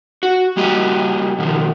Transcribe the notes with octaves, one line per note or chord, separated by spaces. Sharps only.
F#4
G3 A#3 F#4 G4 D#5
B2 D#3 F3